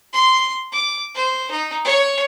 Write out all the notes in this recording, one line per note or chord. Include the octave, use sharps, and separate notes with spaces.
C6
D6
C5
D#4
C#5